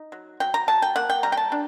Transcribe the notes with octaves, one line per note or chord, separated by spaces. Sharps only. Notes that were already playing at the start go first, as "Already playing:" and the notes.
Already playing: D#4
F#3
F#3 G5
A#5
F#3 A5
G5
A#3 F#5
G5
G3 A#5
G5
A5
D4